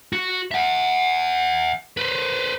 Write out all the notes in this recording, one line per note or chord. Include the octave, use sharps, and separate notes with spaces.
F#4
E5 F#5
B4 C5